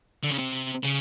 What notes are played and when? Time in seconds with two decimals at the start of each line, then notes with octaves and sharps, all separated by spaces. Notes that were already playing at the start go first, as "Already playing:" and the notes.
0.23 D3
0.31 C#3
0.38 C3
0.84 C#3